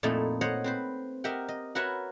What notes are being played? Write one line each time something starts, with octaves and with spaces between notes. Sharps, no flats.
F2 A#2 A3 D#4 E4
C5 C#5 D#5 F#5
C4 B4 C5
G4 A#4 D#5 E5 F#5 G5
D#5
F#4 A#4 B4 C#5 E5 F#5